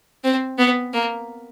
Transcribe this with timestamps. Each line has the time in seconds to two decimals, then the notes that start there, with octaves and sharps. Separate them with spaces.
0.24 C4
0.58 B3
0.93 A#3